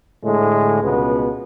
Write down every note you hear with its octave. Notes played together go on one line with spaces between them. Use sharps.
A2 D3 G#3
C#2 B2 B3